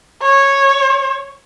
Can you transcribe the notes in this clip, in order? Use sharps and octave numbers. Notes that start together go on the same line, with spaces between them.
C#5